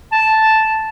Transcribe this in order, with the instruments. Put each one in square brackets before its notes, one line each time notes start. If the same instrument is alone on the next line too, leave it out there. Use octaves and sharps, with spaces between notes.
[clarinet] A5